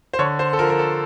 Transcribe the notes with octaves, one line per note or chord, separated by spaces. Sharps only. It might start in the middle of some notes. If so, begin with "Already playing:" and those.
C5
D3 C#5
C5
A4
F3 A#4
A#4
A4